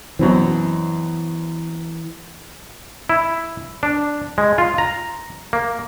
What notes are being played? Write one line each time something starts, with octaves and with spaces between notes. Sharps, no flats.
F#2 B2 E3 C4
E4
D4
G#3
F4
A#5
A#3